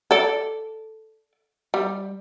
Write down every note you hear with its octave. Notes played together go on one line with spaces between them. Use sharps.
A4 D5
G3